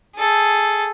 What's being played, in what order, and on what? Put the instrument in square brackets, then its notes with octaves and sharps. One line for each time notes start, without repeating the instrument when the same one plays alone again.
[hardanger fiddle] G#4 A4